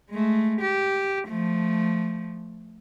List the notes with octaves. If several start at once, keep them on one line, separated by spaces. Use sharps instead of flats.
G#3 A3
G4
F3 A3